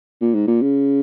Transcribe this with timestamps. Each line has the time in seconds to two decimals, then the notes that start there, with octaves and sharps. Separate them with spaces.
0.21 A#2
0.34 G#2
0.47 A#2
0.62 C#3